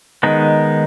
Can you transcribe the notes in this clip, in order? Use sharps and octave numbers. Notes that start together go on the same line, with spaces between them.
D#3 G#3 B3 D#4